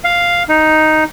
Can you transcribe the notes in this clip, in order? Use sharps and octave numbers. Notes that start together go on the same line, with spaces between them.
F5
D#4